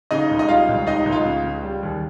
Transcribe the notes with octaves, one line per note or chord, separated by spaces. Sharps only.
C#3 D#4 D#5
C#2
D#5
G3 F4 F5
C#2
C#2 D#4 D#5
C#2
F4 F5
C#3
C#3
G3
D#2